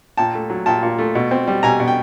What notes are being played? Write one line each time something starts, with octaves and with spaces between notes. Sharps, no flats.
A#2 G5 A5
A3
F#3
A#2 G5 A5
A#2
A3
B2
C4
G3
B2 G#5 A#5
B2
G5